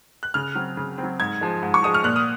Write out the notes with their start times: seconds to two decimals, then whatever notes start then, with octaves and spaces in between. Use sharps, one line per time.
0.23 F#6
0.34 C#3 F6
0.55 F#3 C4
0.77 C#3
0.98 C4
1.03 F#3
1.20 G#2 G#6
1.41 F3 G#3
1.63 G#2
1.74 C#6
1.83 F3 G#3 D#6
1.94 F6
2.04 A#2 F#6
2.16 D#6